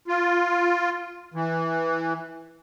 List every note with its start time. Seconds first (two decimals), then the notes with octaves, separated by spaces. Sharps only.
0.08 F4
1.34 E3